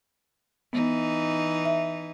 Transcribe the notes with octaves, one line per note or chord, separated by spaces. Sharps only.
E3 B3 D#4
E5